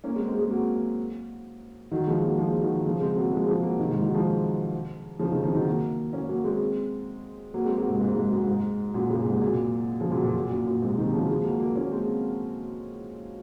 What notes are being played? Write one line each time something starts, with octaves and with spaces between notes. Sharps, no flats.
A#3 C#4
G#3 C4
G#3 C4
G#3
F#3 A#3
D#3 F#3
F3 G#3
F#3 A#3
F3 G#3
D#3 F#3
C#3 F3
G#3 C4
F#3 A#3
F3 G#3
F3 G#3
F#3 A#3
C3 D#3
G#2 C3
D#3 F#3
F3 G#3
C#3 F3
C3 D#3
C#3 F3
D#3 F#3
F#3 A#3
A#3 C#4
F#3 A#3
G#3 C4
F#3 A#3
G#3 C4
F#3 A#3
G#2 C3
G#2
G#2
F#2
G#2
F#2 A#2
A#2 C#3
G#2 C3
F#2 A#2
C#3 F3
F#2 A#2
F#2 A#2
F#2 A#2
F#2
F#2 A#2
G#2 C3
C3 D#3
C#3 F3
F3 G#3
F#3 A#3
F#3 A#3
A#3 C#4
G#3 C4